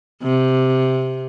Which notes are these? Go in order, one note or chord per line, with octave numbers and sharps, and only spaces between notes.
C3